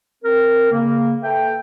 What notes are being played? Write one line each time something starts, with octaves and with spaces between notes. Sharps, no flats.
C4 A#4
C#3 A#3
A4 B4 E5 G5